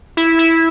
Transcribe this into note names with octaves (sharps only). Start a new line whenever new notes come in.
E4
E4